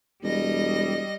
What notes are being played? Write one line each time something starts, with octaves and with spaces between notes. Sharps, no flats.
E1 G3 D#5 A#6